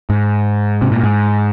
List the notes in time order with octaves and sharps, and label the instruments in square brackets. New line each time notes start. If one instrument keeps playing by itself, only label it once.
[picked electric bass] G#2
C3
A#2
G#2